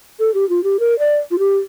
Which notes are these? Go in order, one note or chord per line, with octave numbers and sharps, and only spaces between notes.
A4
G4
F4
G4
A#4
D5
F4
G4